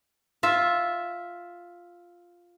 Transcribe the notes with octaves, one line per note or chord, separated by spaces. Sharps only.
F4 E5